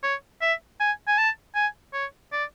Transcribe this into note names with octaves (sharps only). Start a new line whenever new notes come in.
C#5
E5
G#5
G#5
A5
G#5
C#5
D5